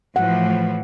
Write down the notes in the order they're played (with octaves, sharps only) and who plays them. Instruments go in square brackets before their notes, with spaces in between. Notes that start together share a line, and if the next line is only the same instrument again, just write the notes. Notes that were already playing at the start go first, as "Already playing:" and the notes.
[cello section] A2 E3 F3 [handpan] F#5